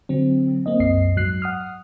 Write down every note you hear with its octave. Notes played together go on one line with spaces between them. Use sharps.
D3 F#3 C4
A#3 C4 D#5
C2 F#2 D#5 C7
G#2 F#3 F#6 C7
F#5 D#6 F6